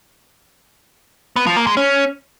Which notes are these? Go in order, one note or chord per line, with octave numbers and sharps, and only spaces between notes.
B3
F3
A#3
G#3
C#4